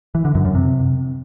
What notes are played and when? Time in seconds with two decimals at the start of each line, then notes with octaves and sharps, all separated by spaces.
0.15 E3
0.25 D3
0.35 F#2
0.45 F#2
0.55 C3